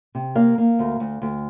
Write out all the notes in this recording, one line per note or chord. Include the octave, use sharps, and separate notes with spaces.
C3
A#3 F5
A#3
D2
D2
D2